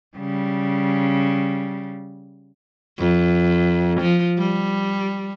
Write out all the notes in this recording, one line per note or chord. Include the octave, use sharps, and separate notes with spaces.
C#3 G3
F2
F3
G3